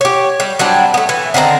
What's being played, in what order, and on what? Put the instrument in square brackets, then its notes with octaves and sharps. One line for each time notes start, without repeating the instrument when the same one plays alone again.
[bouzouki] G4 C#5
G3
F#3 G3 C4 D4
A3 B3
E3
D3 D#3 C4 A#5